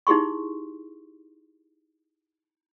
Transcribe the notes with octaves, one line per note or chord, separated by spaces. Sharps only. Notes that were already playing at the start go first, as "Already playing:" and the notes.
D#4 E4 G4 G#4 C6 C#6